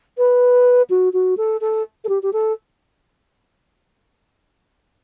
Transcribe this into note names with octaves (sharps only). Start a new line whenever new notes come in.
B4
F#4
F#4
A4
A4
A4
G4
G4
A4